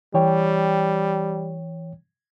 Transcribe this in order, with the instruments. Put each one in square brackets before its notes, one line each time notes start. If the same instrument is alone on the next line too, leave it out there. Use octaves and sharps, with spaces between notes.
[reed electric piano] E3 C#5 G5 [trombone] G3